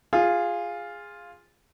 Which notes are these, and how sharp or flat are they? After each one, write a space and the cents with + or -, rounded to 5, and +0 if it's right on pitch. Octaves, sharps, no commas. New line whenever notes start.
F4 +0 G#4 -15